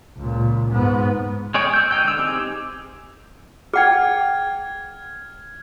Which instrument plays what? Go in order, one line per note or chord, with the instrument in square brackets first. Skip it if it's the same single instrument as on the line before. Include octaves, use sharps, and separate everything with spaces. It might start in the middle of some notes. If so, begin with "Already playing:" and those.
[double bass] C#2 A#2
G#2 B3
[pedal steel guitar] G#3 G#4 C#5 G5
E6 G6
G#3 D#4 G5 G6
D3 E6
C4 D#4 G4 G#4
[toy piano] G#4 F#5 G5 [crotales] F6 G#6